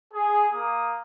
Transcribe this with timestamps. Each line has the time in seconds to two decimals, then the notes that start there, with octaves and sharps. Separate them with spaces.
0.13 G#4
0.54 A#3 D#6